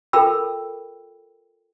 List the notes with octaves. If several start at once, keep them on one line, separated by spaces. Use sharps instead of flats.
F4 A4 A#4 G5 B5 E6